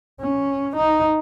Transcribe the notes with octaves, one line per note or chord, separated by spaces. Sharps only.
C#4
D#4